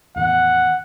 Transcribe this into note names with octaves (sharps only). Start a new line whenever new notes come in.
E2 A2 D#3 F#5